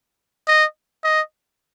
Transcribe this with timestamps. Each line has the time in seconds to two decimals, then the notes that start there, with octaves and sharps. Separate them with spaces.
0.48 D#5
1.04 D#5